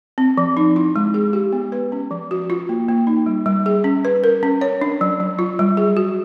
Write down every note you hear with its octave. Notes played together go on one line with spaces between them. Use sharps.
C4
F3
D#4
E4
G#3
G#4
G4
B3
B4
C#4
F3
F#4
F4
A#3
A#3
D#4
G3
G3
G#4
C#4
B4
A#4
C#4
C#5
D4
F#3
F#3
F4
G3
G#4
F#4